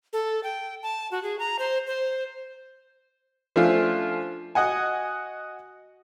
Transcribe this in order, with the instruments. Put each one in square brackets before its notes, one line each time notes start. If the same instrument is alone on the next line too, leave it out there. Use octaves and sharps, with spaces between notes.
[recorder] A4
G5
A5
F#4
G#4
A#5
C5
C5
[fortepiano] F3 A3 C#4 D4 F4
F#4 D#5 F#5 G#5